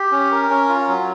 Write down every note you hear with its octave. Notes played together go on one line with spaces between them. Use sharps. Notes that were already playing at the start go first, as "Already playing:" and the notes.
Already playing: G4
C#4
A#4
C#4
F4
F#3